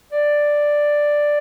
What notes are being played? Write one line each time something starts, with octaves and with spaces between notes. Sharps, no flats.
D5